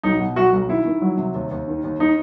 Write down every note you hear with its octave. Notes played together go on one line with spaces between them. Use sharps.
B1 D#4
B2
B1 F#4
B1
D#3 E4
D#3
F#3
C3
D#2
D#2
D#3
D#2
D#3 D#4